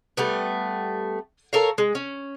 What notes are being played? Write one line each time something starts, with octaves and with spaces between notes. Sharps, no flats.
G3 A3 B3
A4 A#4 C#5 F5
G#3
C#4